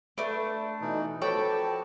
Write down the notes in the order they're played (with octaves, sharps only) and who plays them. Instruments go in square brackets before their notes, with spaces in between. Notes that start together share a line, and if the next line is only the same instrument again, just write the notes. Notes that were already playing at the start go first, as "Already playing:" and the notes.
[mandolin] A3 D4 [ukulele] B4
[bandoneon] B2 E3 D#4
[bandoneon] F3 F#4 A5 [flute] A4 [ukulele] B4 C#5 [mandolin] D5 G5